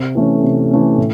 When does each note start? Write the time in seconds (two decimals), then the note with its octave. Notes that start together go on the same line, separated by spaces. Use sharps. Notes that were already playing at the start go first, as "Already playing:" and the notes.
Already playing: C3
0.15 E3 A3 C#4
0.43 C3
0.71 E3 A3 C#4
0.98 A2